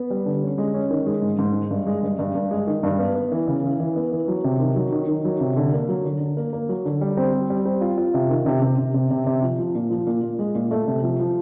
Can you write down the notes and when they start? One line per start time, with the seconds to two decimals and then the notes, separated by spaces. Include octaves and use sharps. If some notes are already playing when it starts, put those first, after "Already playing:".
Already playing: B3
0.10 G3
0.26 D3
0.42 C#4
0.58 G#3
0.74 C#4
0.91 D#3
1.06 G#3
1.22 G#2
1.39 G#2
1.55 G#3
1.71 G2
1.86 G#3
2.03 G2
2.19 G2
2.35 G2
2.51 G#3
2.67 D#3
2.83 G2
2.99 B3
3.15 B3
3.32 E3
3.47 C#3
3.64 E3
3.80 E3
3.96 B3
4.12 E3
4.28 F#3
4.44 C3
4.60 D#3
4.76 F#3
4.92 D#3
5.08 D#3
5.25 F#3
5.40 C3
5.57 D3
5.72 A#3
5.89 F#3
6.05 D3
6.20 D3
6.37 A#3
6.53 A#3
6.69 F#3
6.85 D3
7.01 G3
7.17 C4
7.33 G3
7.50 G3
7.65 C4
7.81 F4
7.98 F4
8.14 C3
8.30 D#3
8.46 C3
8.62 C3
8.78 C3
8.94 C3
9.11 C3
9.26 C3
9.42 F3
9.59 F3
9.75 A#2
9.90 F3
10.07 A#2
10.23 A#2
10.39 G#3
10.55 A#2
10.71 A3
10.87 C3
11.03 F3
11.19 F3